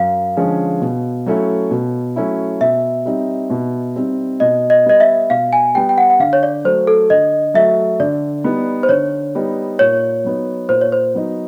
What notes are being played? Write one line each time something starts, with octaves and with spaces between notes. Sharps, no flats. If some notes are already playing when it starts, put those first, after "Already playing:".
Already playing: F#2 F5
D3 F3 G#3 C#4
B2
F#3 A3 C#4 E4
B2
F#3 A3 C#4 E4
B2 E5
G3 C4 D#4
B2
G3 C4 D#4
B2 D#5
D#5
G3 B3 D#5
E5
B2 F5
G#5
G3 B3 G5
G5
F#5
F#5
D3 F5
C#5
D5
F#3 A3 C5
A4
D3 D#5
F#3 A3 E5
D3 D5
G3 B3 D#4
C5
D3 C#5
G3 B3 D#4
A#2 C#5
F#3 B3 D#4
A#2 C5
C#5
C5
F#3 B3 D#4